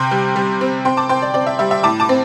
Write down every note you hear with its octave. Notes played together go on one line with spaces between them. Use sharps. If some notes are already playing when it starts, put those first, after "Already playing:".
Already playing: C3 G5 C6
G3
G3
C4
C4 G5 C6
A5 D6
C4 G5 C6
D5
C4 D5
E5
G3 E5
E5
A2 A5 D6
A5 D6
C4